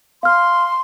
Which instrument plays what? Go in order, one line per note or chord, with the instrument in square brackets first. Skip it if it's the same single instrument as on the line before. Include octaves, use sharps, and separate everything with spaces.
[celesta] F5 F6 [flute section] C6